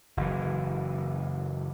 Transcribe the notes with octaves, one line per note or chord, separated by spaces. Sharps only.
F#1 E3